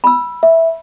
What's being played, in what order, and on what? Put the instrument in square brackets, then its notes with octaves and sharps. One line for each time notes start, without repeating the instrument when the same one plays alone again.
[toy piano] B5 E6
[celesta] E5